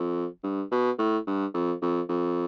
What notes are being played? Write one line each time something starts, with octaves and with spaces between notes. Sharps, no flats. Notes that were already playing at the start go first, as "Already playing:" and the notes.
Already playing: F2
G2
B2
A2
G2
F2
F2
F2